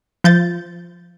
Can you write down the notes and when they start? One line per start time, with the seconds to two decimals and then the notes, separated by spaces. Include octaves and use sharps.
0.24 F3 G6 A6